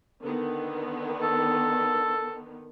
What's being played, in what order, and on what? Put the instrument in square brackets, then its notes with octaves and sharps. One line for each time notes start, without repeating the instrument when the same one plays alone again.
[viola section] D3 D#3 B3
[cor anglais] A4